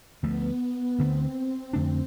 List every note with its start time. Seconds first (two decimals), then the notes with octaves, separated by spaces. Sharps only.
0.23 D2 D3 F3 A3 B3
0.99 D2 D3 A3 C4
1.73 F2 D3 A3 D4